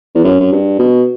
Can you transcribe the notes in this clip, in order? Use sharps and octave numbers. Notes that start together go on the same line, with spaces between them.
E2
F#2
F#2
G2
B2